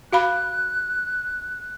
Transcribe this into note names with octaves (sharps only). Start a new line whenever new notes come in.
F#4 F5 B5 F#6